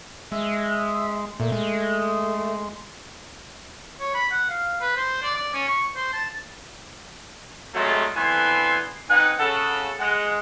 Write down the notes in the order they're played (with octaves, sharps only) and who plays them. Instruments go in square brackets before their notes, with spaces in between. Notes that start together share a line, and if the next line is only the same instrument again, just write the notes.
[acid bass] G#3 [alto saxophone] E5
[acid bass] A#2 [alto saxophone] A3
[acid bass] G#3
[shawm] C#5
B5
F#5
F5
B4
C5
D5
D5
C#4
C#6
C5
A5
[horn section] G2 C3 F#3 G#3 A3 F4
D3 E3 B3 C4 G#5 C6
C4 D#4 B4 F#5 G#5
C#3 A4 F#5
G#3 F#5